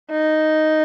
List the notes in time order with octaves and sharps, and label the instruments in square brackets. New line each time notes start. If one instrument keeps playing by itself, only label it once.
[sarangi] D#4